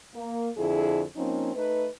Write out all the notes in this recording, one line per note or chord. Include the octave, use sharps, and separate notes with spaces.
A#3
F2 D3 E4 G#4
F3 A#3 C4 C#4 D#4
A3 D#4 B4